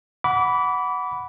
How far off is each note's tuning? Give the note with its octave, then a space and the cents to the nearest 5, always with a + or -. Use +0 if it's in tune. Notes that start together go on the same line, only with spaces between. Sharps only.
F#5 +0 B5 +0 D6 -30